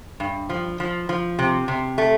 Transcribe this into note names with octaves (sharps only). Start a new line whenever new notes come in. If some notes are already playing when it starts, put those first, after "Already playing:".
G2
F3
F3
F3
C3
C3
A3